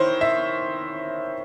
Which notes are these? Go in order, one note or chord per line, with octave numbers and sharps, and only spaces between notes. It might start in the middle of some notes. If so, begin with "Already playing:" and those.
Already playing: D#3 E4 C5 C#5
E5